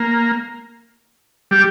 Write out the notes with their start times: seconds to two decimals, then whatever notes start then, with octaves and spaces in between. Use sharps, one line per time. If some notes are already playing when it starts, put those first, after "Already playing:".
Already playing: A#3
1.51 G3 G4